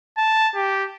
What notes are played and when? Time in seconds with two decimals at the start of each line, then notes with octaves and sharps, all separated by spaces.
0.17 A5
0.55 G4